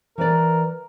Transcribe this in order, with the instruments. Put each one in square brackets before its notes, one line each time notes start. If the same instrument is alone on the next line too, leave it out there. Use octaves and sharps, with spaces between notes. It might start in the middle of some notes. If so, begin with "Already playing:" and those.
[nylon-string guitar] E3 B4 D5 [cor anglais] A#4